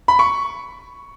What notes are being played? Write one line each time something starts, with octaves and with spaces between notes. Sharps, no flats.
B5
C#6